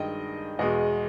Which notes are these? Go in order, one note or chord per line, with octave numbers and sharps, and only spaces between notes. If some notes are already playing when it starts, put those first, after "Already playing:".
Already playing: G2 D#3 G#3 D#5 G5
E2 B2 G#3 D#5